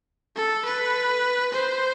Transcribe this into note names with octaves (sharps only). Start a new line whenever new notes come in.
A4
B4
C5